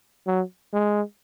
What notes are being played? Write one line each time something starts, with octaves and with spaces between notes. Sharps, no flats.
F#3
G#3